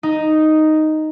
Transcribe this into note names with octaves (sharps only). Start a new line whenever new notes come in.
D#4